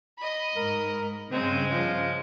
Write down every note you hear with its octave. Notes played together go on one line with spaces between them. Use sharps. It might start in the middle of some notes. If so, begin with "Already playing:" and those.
D#5 B5
G#2 A#4
G2 C#3 G#3 C4
F3